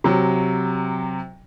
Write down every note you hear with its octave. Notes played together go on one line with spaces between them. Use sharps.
C3 F#3